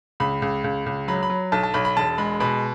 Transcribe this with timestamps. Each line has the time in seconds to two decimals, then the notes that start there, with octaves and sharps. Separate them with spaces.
0.20 C#2 B5
0.42 C#2
0.64 C#2
0.86 C#2
1.08 F#3 B5
1.23 B5
1.30 F#3
1.52 B1 A5
1.63 A5
1.74 B1 B5
1.85 B5
1.97 E1 A5
2.18 G#3 B5
2.40 B2 B5